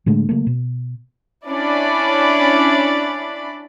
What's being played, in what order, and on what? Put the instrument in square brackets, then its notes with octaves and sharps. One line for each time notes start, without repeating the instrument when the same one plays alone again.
[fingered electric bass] A2 D3 G#3 A3
C#3 F#3 A3 A#3
B2
[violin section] C#4 D4 E4 D5 B5